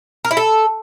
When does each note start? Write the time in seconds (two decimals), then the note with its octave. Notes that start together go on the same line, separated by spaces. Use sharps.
0.25 A#4
0.31 E4
0.37 A4